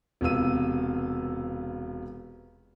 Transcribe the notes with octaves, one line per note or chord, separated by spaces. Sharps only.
E1 C3 B3 F4 E6 D#7